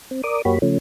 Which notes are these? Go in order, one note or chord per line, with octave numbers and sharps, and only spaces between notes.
C4
A#4 D5 D6 D#6
F#2 A#3 F#4 G4 C#5 B5
C#3 F3 A3 C#4